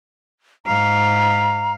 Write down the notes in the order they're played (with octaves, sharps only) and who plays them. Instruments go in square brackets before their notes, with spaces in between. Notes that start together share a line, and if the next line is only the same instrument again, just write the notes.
[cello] G#2 F5 [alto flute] A#5